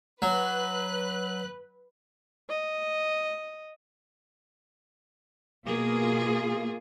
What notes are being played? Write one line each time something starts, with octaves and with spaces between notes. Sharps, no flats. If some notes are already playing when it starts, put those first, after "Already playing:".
F#3 B4 F#6
D#5
B2 A#3 F4 G#4